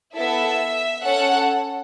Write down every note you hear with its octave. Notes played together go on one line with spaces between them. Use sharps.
B3 E4 A4 E5
C#4 A4 F#5